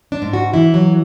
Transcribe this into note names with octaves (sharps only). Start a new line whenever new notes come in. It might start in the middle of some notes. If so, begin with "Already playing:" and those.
D4
G#2
F#4
E3 E4
F#3